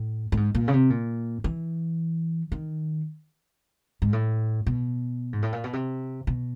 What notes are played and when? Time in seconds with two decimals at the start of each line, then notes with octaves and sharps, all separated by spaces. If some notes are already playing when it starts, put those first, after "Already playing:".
Already playing: A2
0.32 A2
0.37 G#2
0.55 A#2
0.68 C#3
0.73 C3
0.90 A#2
1.44 E3
2.52 D#3
4.02 G#2
4.13 A2
4.67 B2
5.33 G#2
5.43 A2
5.53 A#2
5.64 B2
5.73 C3
6.27 B2